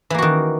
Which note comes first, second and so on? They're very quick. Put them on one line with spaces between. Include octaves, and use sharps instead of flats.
E3 A#3 F#4 D#3